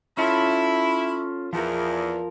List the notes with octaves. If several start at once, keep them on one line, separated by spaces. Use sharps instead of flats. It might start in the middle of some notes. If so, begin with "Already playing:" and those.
C#4 E4 F4 A4
E2 F3 A#4